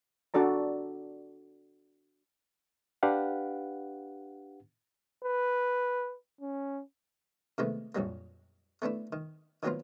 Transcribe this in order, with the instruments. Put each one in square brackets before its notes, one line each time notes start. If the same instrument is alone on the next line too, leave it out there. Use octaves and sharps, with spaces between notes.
[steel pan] D4 F#4 A4 D5 A#5
[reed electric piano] D4 G4 B4 F5 F#5
[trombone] B4
C#4
[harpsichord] C3 D#3 G#3 A3 B3
A#1 F2 F#3 G3 A#3
A3 B3 D4 E4
D#3
D#3 F3 F#3 A#3 B3 F4